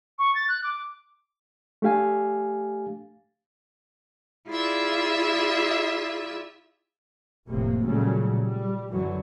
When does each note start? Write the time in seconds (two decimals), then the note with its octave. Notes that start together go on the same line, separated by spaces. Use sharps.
0.19 C#6
0.35 A6
0.48 F#6
0.64 D6
1.82 A3 D4 G4 F5 G#5
4.49 E4 F4 G4 G#4 D5 E5
7.48 F1 A2 C3 A#3
7.84 A#2 C#3 F#3 G3 A3
8.41 G3
8.91 F#2 D3 E3 F#3